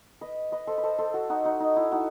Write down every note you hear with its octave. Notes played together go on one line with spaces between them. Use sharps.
B4 D#5
B4 D#5
A4 C5
B4
A4 C5
A4 C5
F#4 A4
D#4 F#4
D#4 F#4
D#4
E4
D#4 F#4